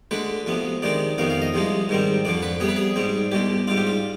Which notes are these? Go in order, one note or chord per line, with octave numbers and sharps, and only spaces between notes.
D2 D3 G#3 D4 B4
D2 C3 F3 B3
C3 D#3 G#3 D4 D5
F2 C3 D#3 B3 F5
F5
D#5
C2 C3 F3 G#3
G#2 D#3 G3 C4
F2 D3 F3 D5
B4
C3 G3 B3 G#4
B4
G#4
G#2 G3 C4
C2 B2 G#3 G4
G#2 G3 D4 F4
G4
F4